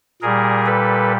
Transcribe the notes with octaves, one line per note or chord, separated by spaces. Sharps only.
A#2 G3 G#4 A#4
A4 B4